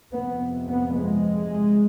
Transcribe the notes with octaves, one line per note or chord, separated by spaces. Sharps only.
F2 C3 B3
B3
G#3